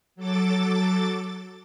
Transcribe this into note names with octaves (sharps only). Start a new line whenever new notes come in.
F#3 A4 D6 A6